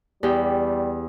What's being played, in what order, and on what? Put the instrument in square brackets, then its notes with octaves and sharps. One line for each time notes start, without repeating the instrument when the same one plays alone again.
[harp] E2 G4 G5 [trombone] G3